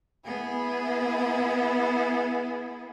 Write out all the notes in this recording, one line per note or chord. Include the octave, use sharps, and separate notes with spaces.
B3 E4 G#4